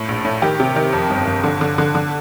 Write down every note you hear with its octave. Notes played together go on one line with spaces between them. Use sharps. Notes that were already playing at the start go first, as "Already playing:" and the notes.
Already playing: A2
A#1
A2
D#3 G4
C3
D#3
F2
G1
G1
D3
D3
D3
D3